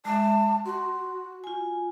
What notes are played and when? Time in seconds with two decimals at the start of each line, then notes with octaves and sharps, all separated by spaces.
0.05 G#3 E5 A5
0.66 F#4 C6
1.44 F4 G#5